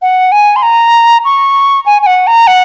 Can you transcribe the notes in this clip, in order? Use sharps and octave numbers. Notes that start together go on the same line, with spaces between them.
F#5
G#5
C6
A#5
C#6
G#5
G#5
F#5
A#5
F#5